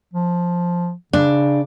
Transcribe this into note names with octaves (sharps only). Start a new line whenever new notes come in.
F3
C#3 D4